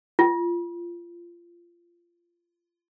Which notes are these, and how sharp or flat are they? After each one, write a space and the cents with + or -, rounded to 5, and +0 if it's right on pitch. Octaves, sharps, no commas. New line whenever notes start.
F4 -20